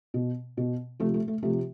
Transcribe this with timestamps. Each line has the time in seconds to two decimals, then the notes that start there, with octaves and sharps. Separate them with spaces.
0.14 B2
0.57 B2
1.00 C3 F3 A3
1.14 A3
1.28 A3
1.43 C3 F3 A3